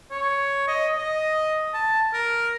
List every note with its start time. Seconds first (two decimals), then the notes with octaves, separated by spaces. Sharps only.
0.11 C#5
0.68 D#5
0.98 D#5
1.74 A5
2.13 A#4